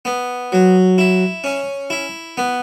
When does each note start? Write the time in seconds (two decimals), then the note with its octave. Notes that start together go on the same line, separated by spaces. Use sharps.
0.05 B3
0.52 F#3
0.98 E4
1.44 C#4
1.90 E4
2.37 B3